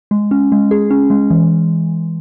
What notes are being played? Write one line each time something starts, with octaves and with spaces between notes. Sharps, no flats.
G#3
C#4
G#3
G#4
C#4
G#3
E3